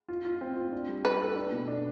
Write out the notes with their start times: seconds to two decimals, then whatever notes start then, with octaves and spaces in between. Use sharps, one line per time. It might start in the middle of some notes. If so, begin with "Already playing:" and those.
0.08 F4
0.25 F4
0.41 C4
0.57 F4
0.72 D4
0.88 G3
1.05 D4 B4
1.20 A4
1.36 D4
1.52 B2
1.68 D4